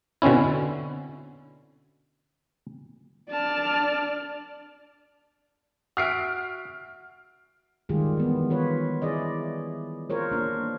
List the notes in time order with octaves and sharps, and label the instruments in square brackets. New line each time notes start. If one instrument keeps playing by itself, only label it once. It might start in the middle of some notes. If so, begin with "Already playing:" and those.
[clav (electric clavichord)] B2 D3 C4 C#4 E4
[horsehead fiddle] D4 D5 [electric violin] A5 F6
[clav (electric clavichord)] F#4 E5 [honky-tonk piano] F6 C7 D7
[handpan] D#3 G3 G#3 F4 G4 G#4
E3 B3
F4 B4 C#5
E4 G#4 D5 D#5
F4 A#4 C5 C#5
A#3 D4